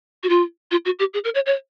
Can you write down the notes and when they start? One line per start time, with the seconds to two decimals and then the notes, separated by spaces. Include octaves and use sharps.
0.23 F#4
0.29 F4
0.71 F4
0.85 F#4
0.99 G4
1.14 G#4
1.24 A#4
1.35 C#5
1.46 C#5